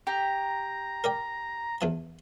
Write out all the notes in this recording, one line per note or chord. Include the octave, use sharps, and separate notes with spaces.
G4 A#5
A#4 D5 G5
E2 E3 A5